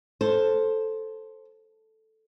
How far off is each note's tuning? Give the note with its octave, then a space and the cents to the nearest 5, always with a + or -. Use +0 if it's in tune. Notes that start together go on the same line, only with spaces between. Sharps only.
A4 +0 C5 +10